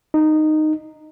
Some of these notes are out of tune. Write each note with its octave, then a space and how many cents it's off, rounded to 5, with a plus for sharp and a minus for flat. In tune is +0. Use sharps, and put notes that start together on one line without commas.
D#4 -10